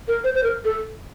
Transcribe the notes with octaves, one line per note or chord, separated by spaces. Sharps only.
A#4
C5
C5
A#4
A4